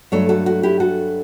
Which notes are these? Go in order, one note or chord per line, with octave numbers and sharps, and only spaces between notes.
G2 F#3 A3 D4 A4 C#5
F#4 A4
F#4
E4 G4
F#4 A4